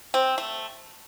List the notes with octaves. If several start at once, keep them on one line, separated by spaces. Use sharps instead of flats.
C4
A3